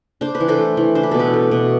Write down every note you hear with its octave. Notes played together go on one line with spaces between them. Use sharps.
D4 C5
B4
E3
A4 C5
A3
E3
D4 C5
B4
B2 A4
G4 B4
A3
B2